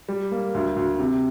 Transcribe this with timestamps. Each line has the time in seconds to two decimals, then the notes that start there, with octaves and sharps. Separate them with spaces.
0.08 G3
0.32 A#3
0.54 D2
0.76 D2
0.99 C3